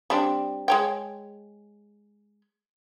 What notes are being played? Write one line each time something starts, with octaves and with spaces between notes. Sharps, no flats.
G3 C4 D4
G#3 C#5 G5